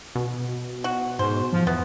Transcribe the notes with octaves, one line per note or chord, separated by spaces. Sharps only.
B2
F#4
G#2 C5
F3
E2 B3